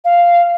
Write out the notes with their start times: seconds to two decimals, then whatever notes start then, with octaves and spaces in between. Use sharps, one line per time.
0.05 F5